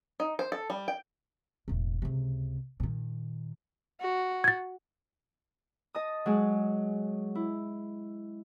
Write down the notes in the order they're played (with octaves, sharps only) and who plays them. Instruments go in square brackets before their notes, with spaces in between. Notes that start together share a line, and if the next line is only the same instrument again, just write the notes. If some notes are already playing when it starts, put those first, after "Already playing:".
[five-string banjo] D#4
C5
A4
G3
G5
[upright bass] E1 A2
C#2 C3
A#2 D#3
[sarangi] F#4
[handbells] G#6 A6
[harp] D#5 A5 D#6
F#3 G#3
E4